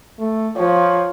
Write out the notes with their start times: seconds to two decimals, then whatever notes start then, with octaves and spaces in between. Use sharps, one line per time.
0.19 A3
0.57 F3 C#5